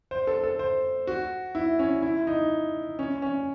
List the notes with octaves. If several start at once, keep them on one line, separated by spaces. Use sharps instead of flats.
C5
A4
A4
C5
F#4
E4
C#4
E4
D#4
C#4
C#4